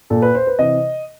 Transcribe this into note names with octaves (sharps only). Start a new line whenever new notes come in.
A#2 A4
B4
C5
B4
C3 E3 D#5